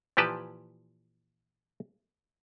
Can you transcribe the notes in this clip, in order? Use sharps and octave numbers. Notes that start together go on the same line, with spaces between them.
A#2 E3 F3 G4 B4 A5